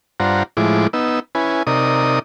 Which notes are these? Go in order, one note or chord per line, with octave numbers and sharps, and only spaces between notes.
G2 D4 F4 C5 F#5 A#5
A2 F3 G#3 E4 D6
B3 D#4 E6
C#4 E4 B4 G#5
C3 D#4 A#4 D5 D#6